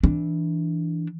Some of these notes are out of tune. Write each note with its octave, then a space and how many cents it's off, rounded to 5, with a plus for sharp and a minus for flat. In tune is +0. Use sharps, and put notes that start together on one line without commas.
E3 -5 D4 +0